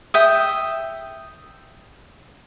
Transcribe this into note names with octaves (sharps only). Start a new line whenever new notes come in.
E5 G5 D#6